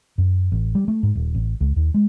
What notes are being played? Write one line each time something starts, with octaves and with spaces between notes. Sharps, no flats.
F#2
A1
G3
A3
G#2
D#1
A1
C#2
D#2
G#3